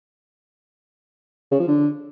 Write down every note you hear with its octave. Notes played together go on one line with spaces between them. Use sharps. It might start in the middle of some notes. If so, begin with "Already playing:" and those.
C#3
F3
D3